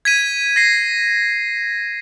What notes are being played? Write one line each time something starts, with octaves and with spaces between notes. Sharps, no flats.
G#6 B6 D#7
A#6 C7